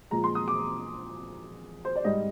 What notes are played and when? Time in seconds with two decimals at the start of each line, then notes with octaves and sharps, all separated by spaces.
0.11 A#2 F3 G#3 A#5
0.24 C6
0.35 D#6
0.48 D6
1.85 C5
1.96 D5
2.04 G#2 G3 D#5